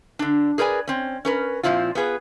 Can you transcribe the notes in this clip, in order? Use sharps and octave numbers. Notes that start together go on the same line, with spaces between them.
D3 D4
G#4 A#4 B4 D5 G#5
C4 C#4
C#4 A#4 B4
A#2 F3 C4 E4 F4
B3 F4 G#4 B4